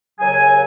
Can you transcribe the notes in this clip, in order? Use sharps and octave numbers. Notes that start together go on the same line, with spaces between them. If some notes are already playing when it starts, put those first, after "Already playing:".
D#2 C#3 F#3 G#5